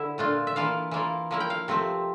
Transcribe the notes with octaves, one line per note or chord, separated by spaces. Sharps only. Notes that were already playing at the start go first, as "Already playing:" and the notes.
Already playing: D3 E4 E5
A#2 A3 D4 F4
E5
E3 A#3 F4 F5
E3 A#3 F4
F3 A#3 E4
G5
F5
C3 F3 A3 C4